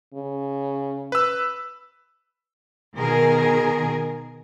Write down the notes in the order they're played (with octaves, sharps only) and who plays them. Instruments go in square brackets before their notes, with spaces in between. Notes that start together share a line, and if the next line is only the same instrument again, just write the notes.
[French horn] C#3
[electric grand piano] B4 E6
[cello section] B2 D#3 G#4 A#4